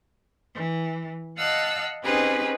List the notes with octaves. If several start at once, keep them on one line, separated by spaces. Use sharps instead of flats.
E3
D#5 F5 F#5 A5 E6 F#6
C4 C#4 D#4 G4 G#4 B4